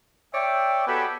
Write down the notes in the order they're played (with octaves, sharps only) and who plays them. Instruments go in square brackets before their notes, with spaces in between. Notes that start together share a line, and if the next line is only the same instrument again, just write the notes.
[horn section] C#5 D5 E5 G5
B3 F#4 G4 A4 G#5 B5